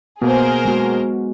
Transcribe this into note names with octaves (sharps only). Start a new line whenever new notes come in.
B2 A#3 B3 G#4 A#4 C5
G#3 B3 F#4